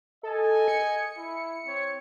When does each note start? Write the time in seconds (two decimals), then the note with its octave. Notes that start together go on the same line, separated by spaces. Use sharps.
0.23 A4 D#5 G#5
0.68 C#7
1.16 E4
1.65 C4 C#5